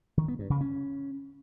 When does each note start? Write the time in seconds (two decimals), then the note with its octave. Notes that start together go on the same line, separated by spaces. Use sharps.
0.17 D#3
0.28 B3
0.39 G2
0.50 C#3
0.61 C#4